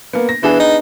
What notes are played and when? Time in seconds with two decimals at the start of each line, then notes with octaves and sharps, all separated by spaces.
0.13 A#3 B3
0.29 A#6
0.43 E3 B3 D4 G#4
0.60 D#4